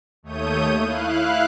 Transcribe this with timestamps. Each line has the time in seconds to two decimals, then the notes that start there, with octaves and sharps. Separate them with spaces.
0.23 D#2 A3 C#5 D#6 G6 D#7
0.79 E4 F5 F#6